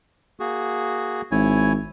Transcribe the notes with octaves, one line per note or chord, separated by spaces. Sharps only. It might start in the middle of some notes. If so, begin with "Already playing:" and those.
A#3 F#4 G#4
G#1 E4 C#5 G#5